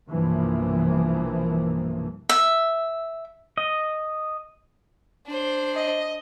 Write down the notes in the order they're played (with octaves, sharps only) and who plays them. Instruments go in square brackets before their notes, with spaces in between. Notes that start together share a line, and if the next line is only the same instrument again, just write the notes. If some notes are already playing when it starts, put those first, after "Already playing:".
[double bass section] B1 G2 C3 E3 F3 A#3
[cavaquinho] E5
[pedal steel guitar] D#5
[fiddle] D4 C5
[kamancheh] D#5